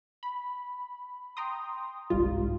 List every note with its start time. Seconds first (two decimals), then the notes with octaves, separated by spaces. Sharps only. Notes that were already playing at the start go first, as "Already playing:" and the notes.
0.23 B5
1.37 G5 A#5 C6 D#6
2.10 G1 C2 G#2 G3 F4